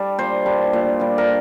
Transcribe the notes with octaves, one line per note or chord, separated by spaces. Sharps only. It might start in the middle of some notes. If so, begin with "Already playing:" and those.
Already playing: G3 D4
A#2 C5
G3 D4
A#2
G3 D4
A#4